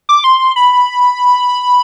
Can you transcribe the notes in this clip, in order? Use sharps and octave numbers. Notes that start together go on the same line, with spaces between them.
D6
C6
B5